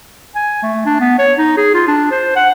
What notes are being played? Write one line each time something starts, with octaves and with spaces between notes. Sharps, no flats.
G#5
A3
D4
B3
C#5
D#4
G#4
F4
D4
C5
F#5